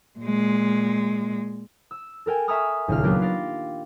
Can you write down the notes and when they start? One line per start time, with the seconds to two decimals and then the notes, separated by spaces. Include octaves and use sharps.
0.19 A#2 G#3
1.91 E6
2.26 A4 A#4 G5 G#5
2.48 E5 G#5 A#5 C#6 D#6 F6
2.88 D#1 C#2 F4 F6
3.03 F#3 A#3 B3 D4 F4 G4
3.22 F5 G5 A6 A#6